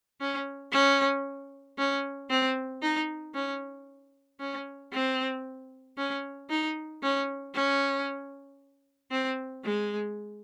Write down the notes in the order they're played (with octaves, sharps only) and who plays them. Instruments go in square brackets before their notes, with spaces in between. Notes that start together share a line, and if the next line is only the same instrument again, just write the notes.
[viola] C#4
C#4
C#4
C4
D#4
C#4
C#4
C4
C#4
D#4
C#4
C#4
C4
G#3